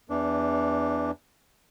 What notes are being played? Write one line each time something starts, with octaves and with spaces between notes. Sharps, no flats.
E2 E3 D4